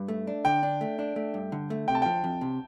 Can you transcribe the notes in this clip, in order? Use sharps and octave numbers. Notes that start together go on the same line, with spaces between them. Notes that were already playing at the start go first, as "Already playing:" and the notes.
Already playing: G2
A3
D4
D3 G5
D4
A3
D4
A3
G2
D3
A3
C3 G5
A5
F3 G5
F2
C3